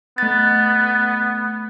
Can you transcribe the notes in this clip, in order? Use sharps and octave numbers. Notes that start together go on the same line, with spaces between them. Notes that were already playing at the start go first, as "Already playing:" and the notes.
A3 B3 A6